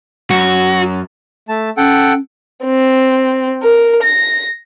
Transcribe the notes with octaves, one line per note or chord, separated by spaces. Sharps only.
F#2 F#4
A3 A5
C#4 A4 F#5 G5
C4
A#4
A#6